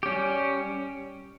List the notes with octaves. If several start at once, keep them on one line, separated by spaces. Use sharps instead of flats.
G3 C#4 G4